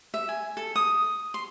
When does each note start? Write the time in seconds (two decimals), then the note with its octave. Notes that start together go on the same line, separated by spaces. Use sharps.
0.14 E5
0.29 G#5
0.57 A4
0.76 D#6
1.34 C6